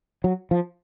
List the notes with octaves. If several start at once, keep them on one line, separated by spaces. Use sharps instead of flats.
F#3
F3